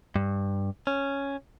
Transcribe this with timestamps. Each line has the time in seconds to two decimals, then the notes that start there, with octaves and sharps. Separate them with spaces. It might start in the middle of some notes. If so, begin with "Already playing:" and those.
0.16 G2
0.87 C#4